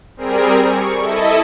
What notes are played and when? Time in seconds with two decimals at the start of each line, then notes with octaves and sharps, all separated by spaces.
0.17 G3 C4 G#4 A#4
0.66 C#6
0.99 E4 A4 D#5